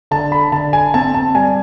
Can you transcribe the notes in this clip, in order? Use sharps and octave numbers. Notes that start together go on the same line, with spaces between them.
D3 A5
B5
D3 A5
G#5
C4 A5
A5
G3 G#5